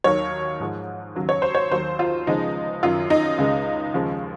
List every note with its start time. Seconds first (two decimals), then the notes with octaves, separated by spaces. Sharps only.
0.04 D#2 D#3 F#3 C#5
0.60 G#2 F3 G#3
1.15 D#2 C#3 F#3
1.29 C#5
1.42 C5
1.55 C#5
1.71 D#2 D#3 F#3 C5
1.99 F4
2.27 C#2 C#3 F3 G#3 D#4
2.83 F#2 D#3 F#3 F4
3.10 D#4
3.38 C#2 C#3 G#3
3.94 D#2 C#3 F3 G#3